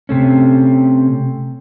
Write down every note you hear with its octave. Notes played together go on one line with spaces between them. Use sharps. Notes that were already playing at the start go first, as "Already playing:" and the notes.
C3 A3 C#4